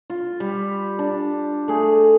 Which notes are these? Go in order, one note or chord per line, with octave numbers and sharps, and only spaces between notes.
F4
G3
D4
A3 G#4